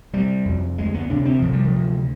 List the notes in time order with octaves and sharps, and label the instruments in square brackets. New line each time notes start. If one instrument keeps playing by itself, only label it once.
[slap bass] C3 G3
F2
D2 G#3
B3
C3 D4
C4
C3 F3
G3
F3
D2